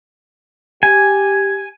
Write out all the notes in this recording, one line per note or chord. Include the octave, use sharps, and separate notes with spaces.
G4 G#5